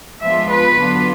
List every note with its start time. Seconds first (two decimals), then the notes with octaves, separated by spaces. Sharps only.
0.22 F3 G#3 B3 D4 F4 E5
0.50 B4
0.78 D3 F#3 B3 D4 F4